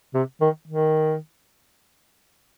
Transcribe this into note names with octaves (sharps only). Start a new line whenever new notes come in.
C3
D#3
D#3